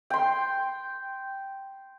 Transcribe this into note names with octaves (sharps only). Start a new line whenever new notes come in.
G5 C6